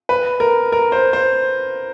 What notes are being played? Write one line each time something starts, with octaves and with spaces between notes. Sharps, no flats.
B4
A#4
A#4
C5
C5